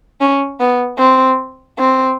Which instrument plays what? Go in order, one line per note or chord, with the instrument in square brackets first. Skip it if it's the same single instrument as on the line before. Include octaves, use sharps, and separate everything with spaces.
[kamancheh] C#4
B3
C4
C4